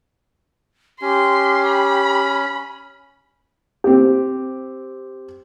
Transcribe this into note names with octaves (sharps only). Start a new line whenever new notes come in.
C#4 G4 C6
B5
C4 G4